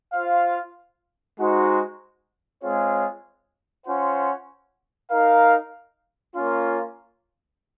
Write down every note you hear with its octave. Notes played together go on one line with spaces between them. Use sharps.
F4 C5 F5
G#3 D#4 F#4 C5
G#3 C4 F4 G#4 C#5
C#4 F4 C5 F#5
D#4 A#4 F5
A#3 C#4 F4